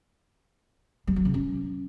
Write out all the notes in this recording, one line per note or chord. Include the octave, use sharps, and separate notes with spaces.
G3
F#3
C#3
C#4